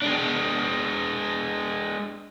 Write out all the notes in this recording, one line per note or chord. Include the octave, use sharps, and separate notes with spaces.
G#3 D4